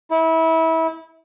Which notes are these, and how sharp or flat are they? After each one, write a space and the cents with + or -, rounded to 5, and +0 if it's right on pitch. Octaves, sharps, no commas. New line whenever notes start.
E4 -25